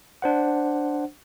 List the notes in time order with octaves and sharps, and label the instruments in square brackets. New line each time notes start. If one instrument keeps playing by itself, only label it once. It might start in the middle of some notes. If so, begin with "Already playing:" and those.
[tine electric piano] D4 C5 F#5